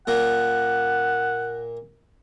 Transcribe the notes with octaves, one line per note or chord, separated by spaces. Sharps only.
A#2 A#3 F#5